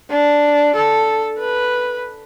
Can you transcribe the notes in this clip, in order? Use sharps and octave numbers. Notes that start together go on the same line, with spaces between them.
D4
A4
B4